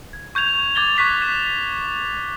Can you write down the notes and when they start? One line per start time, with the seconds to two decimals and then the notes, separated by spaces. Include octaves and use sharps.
0.13 G#6
0.35 C#6 G6 G#6 F7
0.75 D6 G#6 A6 G7
0.97 C#6 F#6 B6 F7
1.22 E7